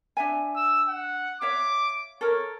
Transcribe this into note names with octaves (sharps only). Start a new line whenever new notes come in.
D4 E5 G#5
E6
F#5
C#5 E5 F5 D6
A4 A#4 C#5